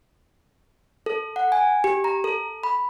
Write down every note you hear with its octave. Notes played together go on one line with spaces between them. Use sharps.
A4
F#5
G#5
G4
A#5
A4
B5